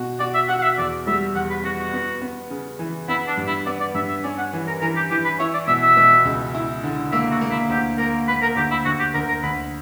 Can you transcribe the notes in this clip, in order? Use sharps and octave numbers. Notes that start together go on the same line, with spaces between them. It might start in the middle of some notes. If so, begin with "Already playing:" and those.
Already playing: B2 F#4
F#4 D5
E5
F#4 F#5
F#5
E5
E2 D5
G3 E5
E2 F#5
B4
B3 F#4
F#4
B3
B3
C#3
E3
B3 E4
D4
G2
E4
B3 D5
D5
G2 E5
E5
C#4 D5
F#5
E3
A#4
E3 A#4
G4
E3 G4
B4
E4 C#5
D5
B2 E5
E5
B2
C#2
E4
D3
A#3 E5
F#4
A#3
E4
D2 G4
A#3 A#4
A#3 B4
A#4
D2 G4
E4
D2 F#4
G4
D2 A#4
A#4
D2 B4